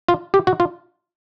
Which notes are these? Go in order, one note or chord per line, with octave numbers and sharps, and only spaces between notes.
F4
G4
F#4
F4